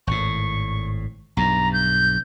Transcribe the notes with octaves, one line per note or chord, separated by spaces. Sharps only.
G#1 A2 C#6
B1 G2 A#5
G6